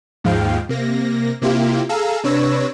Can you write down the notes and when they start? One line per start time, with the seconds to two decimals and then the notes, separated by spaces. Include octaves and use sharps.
0.24 D#2 G#2 F3 G#3 F5 G5
0.69 C3 A#3 A#6
1.42 C3 A#3 E4 F4 G4
1.89 G#4 A4 F5 A#5 E6
2.24 C3 D4 B4 C#5 E6 A#6